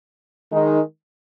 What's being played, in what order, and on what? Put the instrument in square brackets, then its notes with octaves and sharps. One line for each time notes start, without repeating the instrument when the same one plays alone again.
[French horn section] D#3 G#3 D#4